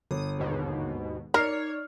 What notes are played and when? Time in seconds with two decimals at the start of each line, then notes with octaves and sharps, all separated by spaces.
0.11 G1 D#6
0.38 D#2 G#2 B2
1.34 D#4 A#4 C#5 D5 F6 C7